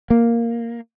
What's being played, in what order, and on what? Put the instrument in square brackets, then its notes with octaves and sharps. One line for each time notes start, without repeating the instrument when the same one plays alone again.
[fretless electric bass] A#3